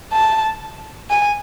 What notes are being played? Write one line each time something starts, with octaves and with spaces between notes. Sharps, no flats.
A5
G#5